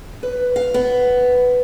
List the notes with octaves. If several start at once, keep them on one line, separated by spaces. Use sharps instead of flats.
B4
F5
B3